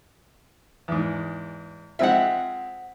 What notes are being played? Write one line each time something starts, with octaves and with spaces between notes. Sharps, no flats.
E2 G#2
G#3 C4 F4 E5 F#5